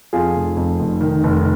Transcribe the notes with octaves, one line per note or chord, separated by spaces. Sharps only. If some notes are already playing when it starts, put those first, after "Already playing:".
F2 F4 G#4
F1
F2
F1
D#3
F1